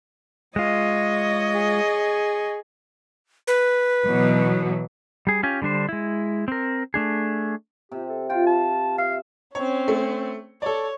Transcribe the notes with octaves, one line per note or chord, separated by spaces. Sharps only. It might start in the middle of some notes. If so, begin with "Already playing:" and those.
G#3 F4 C#5 D#5
G#4
B4
B2 E3 F#3
G3 G#4
C#4 F4 G4 G#5
D3 G3 D4 C5
G#3 E4
C4 A#4
A3 D4 G#4
C3 G4
A4
F4 G5
A5
E5 F5
C4 C#4 C#5
A3
A4 C#5 D5